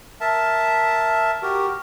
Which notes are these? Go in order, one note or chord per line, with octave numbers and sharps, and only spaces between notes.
A#4 E5 A5
F#4 G4 A#4